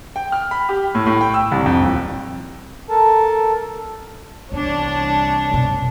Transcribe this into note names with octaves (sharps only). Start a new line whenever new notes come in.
G5
F6
B5
G4
A2
A2
G5
E6
C2
F2
D#1
A4 A#4 A5
C2 E3 B3 D4 C#5
F#2 B2